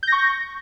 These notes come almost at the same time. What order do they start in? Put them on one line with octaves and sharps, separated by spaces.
G6 A#6 C#6